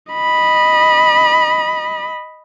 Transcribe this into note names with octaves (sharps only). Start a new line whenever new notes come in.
D#5 B5